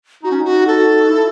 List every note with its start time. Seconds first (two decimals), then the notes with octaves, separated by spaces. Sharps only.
0.23 D#4 F#4
0.32 C#4
0.40 D#4 F#4
0.67 A4
0.98 F#4
1.10 E4